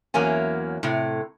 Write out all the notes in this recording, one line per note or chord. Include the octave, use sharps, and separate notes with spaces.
E2 F#3 A#3 C#4 G#5
A2 C3